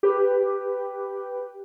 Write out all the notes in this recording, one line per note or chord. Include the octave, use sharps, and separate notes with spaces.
G4 B4